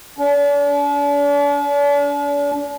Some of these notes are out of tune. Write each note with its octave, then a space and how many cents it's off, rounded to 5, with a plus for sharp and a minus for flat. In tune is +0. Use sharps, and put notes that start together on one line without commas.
D4 -45